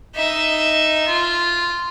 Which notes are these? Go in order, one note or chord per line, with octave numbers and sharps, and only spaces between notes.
D#4 E5
F4